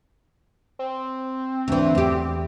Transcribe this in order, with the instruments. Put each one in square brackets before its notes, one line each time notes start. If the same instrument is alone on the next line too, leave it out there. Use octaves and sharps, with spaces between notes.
[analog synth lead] C4
[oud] D2 E3
E2 G4